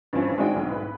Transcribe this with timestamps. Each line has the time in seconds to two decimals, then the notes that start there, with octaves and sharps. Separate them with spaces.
0.13 G2 E3 F3 C4 C#4
0.38 G#3 C4 D4 D#4 F#4 G5
0.56 B1 G#2
0.70 E4 B4